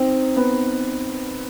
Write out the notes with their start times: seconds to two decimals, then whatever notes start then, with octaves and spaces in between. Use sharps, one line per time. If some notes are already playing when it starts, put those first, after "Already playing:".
Already playing: C4 D#4
0.37 B3